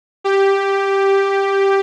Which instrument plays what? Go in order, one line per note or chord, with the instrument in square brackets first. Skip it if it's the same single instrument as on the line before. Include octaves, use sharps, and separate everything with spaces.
[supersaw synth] G4